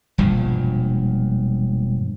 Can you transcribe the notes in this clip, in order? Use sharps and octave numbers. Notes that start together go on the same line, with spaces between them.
E1 G2 A#2 F3